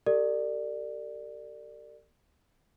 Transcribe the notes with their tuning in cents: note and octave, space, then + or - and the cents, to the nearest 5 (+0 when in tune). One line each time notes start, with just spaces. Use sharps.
G4 +0 A#4 -45 D5 +15